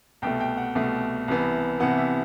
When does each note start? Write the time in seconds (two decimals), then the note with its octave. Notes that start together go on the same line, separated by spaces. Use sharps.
0.22 C2 B2 A3 G5
0.40 G5
0.58 F#5
0.75 C2 B2 A3
1.28 C2 C3 E3 B3
1.80 C2 C3 E3 B3 F#5
1.98 E5